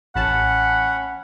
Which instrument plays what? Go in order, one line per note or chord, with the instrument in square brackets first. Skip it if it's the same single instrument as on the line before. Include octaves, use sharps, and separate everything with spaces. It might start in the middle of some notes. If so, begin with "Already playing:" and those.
[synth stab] A1 A5 [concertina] C#4 B5 [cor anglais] F#5